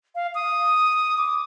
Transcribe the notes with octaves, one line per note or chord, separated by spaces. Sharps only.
F5
D#6
D6